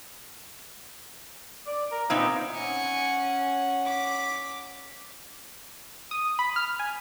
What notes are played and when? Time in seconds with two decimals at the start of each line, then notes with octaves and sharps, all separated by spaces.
1.67 D5
1.91 A#4
2.10 A#2 B3 C4 D#4
2.54 C#4 F#5 G#5 C#7
3.86 D6 B6
6.11 D#6
6.39 B5
6.56 F6
6.79 G#5